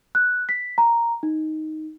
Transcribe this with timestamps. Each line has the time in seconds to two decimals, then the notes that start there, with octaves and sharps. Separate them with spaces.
0.15 F#6
0.49 B6
0.78 A#5
1.23 D#4